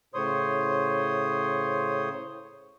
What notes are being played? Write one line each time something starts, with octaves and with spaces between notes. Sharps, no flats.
A2 C#3 C5 C#5 C6 D#6